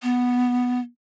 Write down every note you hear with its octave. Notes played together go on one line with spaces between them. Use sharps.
B3